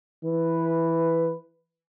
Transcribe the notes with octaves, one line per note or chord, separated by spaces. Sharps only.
E3 B4